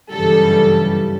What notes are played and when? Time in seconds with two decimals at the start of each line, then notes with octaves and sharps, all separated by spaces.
0.11 G1 F#2 C#3 E3 G3 A4